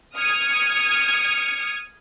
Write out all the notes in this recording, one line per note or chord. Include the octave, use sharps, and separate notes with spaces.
D#6 F6 G#6 C#7